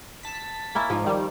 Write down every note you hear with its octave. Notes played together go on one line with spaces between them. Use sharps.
A5 B6
A#3 C#4 E4
G#2 F3 A#3
D#3 G3